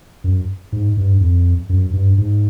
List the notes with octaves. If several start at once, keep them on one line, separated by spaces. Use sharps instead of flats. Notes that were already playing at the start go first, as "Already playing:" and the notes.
F#2
G#2
G2
F2
F#2
G2
G#2